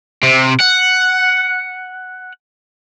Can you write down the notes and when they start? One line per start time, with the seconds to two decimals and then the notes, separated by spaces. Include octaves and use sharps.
0.23 C3
0.60 F#5